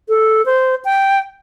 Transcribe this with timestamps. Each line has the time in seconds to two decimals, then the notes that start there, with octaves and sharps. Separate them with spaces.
0.09 A4
0.46 C5
0.85 G5